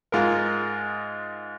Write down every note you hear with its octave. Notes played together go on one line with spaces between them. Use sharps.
G#2 G#3 F4 A#4